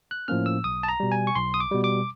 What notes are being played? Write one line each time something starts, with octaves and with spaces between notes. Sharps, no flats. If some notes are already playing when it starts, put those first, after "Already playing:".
F#6
A2 F3 A#3 C#4 F6
E6
B1 D#6
A5
A#5
B2 G3
G#5
C#6
B1 C6
D#6
D6
B2 G3
D6